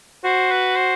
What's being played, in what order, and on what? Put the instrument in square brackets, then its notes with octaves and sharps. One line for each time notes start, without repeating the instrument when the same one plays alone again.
[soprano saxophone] F#4 [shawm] C5
[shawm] B4
C5